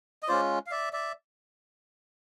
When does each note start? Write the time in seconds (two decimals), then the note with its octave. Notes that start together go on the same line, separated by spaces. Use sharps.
0.23 D#5
0.28 G#3 C#4 F4 C5 D5
0.67 F5
0.71 D5 E5
0.93 D5 E5